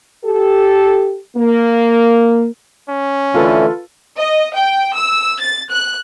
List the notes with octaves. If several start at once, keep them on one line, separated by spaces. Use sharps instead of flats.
G4 A4
A#3
C#4
D3 E3 A3 F4 A4 B4
D#5
G5
E6
A6
F#6